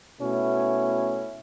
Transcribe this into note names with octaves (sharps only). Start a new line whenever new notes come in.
B2 A3 C#4 E4